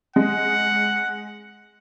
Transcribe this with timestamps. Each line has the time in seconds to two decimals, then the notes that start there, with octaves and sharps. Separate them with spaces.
0.16 G#3 F#5